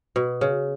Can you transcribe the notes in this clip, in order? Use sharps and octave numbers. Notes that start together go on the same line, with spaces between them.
B2
C#3